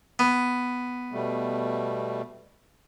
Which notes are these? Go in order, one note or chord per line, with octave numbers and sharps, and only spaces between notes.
B3
B2 G3 A3